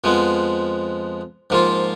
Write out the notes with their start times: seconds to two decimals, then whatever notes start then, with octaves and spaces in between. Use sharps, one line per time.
0.04 F2 F3 G#3 B3
1.50 G#2 F3 A#3 F4